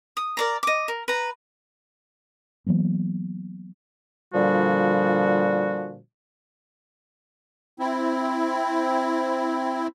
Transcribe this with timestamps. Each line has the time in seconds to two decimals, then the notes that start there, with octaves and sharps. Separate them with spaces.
0.17 D#6
0.37 A#4 D5 A#5
0.63 D#5 D6
0.88 A#4
1.08 B4 A#5
2.67 E3 F#3 A#3 B3
4.34 A#2 D3 F3 G3 F#4
7.79 C4 E4